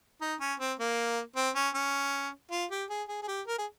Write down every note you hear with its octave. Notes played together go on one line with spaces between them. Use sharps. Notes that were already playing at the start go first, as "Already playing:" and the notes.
D#4
C#4
C4
A#3
C4
C#4
C#4
F4
G4
G#4
G#4
G#4
G4
A#4
G#4